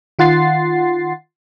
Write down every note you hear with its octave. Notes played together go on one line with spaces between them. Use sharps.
D#3 F4 F#5 C6 A6 C7